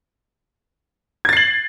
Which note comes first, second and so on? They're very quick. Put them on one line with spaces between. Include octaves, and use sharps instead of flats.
G#6 A6 C7 F#7